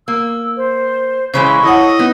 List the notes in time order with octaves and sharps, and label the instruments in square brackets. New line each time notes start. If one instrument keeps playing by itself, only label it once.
[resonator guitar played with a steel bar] A#3 [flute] E6
[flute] C5
[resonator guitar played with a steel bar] C#3 E3 G#3 [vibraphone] C5 B5 [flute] C#6
[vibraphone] E4 C#5 F#5 [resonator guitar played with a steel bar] A4 [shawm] D#5
[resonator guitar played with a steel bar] B3 D#4